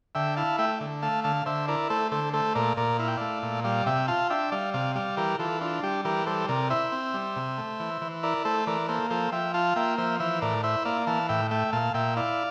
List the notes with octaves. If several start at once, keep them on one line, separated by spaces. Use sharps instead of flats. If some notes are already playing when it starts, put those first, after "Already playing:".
D3 E5 G5
E4 F5 A5
A3 E5 G5
D3
A3 F5 A5
D3 F5 A5
D3 C5 E5
E4 A#4 D5
A3 A4 C5
D3 A4 C5
A3 A4 C5
A#2 A#4 D5
A#2 A#4 D5
E4 F5
G5
A3 D5 F5
A#2
G3 D5 F5
C3 E5 G5
F4 F5 A5
D4 E5 G5
G3 D5 F5
C3 D5 F5
G3 D5 F5
E3 G4 A#4
E3 F4 A4
D4 F4
G3 G4
E3 G4 A#4
G3 A4 C5
C3 A#4 D5
E4 C5 E5
C4
G3
C3
A3
E3
E3
E4 A#4 D5
A3 A4 C5
E3 A#4 D5
A#3 A4 C5
F3 A4 C5
F3 E5 G5
F4 F5 A5
A#3 E5 G5
F3 C5 E5
E3 C5 E5
A2 A#4 D5
E4 C5 E5
A#3 D5 F5
E3 F5 A5
A2 E5 G5
A3 E5 G5
A#2 F5 A5
A#2 E5 G5
E4 D5 F5